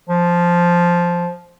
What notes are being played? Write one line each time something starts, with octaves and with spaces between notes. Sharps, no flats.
F3